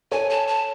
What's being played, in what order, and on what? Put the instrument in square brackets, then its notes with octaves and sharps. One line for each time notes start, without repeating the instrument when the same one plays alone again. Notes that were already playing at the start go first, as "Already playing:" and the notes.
[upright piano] A4 C#5 [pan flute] G#5
[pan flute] A5
A5